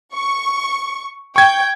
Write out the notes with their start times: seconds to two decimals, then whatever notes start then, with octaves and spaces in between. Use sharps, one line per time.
0.14 C#6
1.36 G5 C#6 G6 G#6